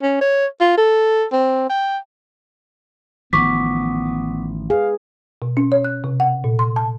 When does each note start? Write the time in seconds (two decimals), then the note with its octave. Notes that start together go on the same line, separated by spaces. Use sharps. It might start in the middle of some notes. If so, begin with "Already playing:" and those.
0.02 C#4
0.21 C#5
0.60 F4
0.77 A4
1.32 C4
1.69 G5
3.33 A1 D#3 F3 B3 C#6 D6 B6
4.70 G#4 B4 F5
5.42 B2
5.57 C#4
5.72 C#5
5.85 F#6
6.04 C3
6.20 F#5
6.44 A#2
6.59 C6
6.76 A5